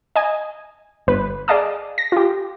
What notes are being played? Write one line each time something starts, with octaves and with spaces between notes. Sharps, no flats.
D#5 G#5
G1 B4
G#4 D5 D#5 F5 A5 D#6
A#6
F4 G4